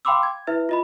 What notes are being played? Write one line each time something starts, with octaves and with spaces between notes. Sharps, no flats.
F5 G5 B5 C6 D6 E6
G#6
E4 B4 E5
F4 D#5 B5